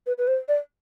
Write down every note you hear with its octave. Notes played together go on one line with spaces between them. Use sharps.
B4
B4
C5
D5